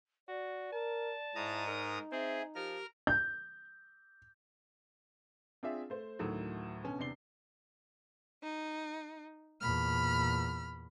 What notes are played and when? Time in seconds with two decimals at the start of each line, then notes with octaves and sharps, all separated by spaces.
0.28 F#4 D5
0.73 A#4 A5
1.35 G#2 E4 A#5 D#6
1.67 D#4 A#4
2.12 C4 G#4 E5
2.55 F3 G4 A#4 F6
3.07 G6
5.63 C4 D4 F4 G#4 E5
5.90 A3 C5
6.19 D2 A2 D#3 F#3
6.83 B2 D3 C#4
6.98 E2 C3 D4 C7 G7
8.43 D#4
9.61 E2 A#2 B5 F6